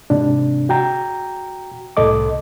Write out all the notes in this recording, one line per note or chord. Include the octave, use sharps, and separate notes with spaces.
G#2 C3 D4
F#4 G5 A#5
C2 A2 A4 D#5 D6